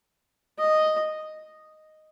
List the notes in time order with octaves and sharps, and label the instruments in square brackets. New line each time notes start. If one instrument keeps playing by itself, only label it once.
[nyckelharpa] D#5